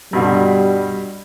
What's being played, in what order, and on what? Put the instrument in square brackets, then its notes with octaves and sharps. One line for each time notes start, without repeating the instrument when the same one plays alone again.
[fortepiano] G2 B2 D3 [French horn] G3